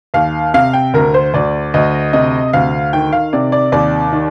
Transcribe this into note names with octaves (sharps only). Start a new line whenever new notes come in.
D#2 F5
C3 F5
G5
D2 A#4
C5
D2 D5
D2 D#5
C3 D#5
D2 F5
D#3 G5
F5
C3 D5
D5
D#2 D5
D#3